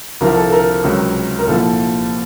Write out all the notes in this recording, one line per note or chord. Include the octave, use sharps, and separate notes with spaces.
C2 C3 F3 A#4
A4
A4
A#4
C#2 C3 F#3
A#4
C2 A#2 F3 A4